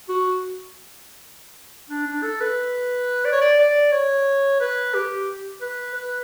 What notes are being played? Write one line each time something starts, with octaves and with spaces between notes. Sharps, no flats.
F#4
D4
D4
A4
B4
D5
C#5
D5
D5
C#5
B4
G4
B4
B4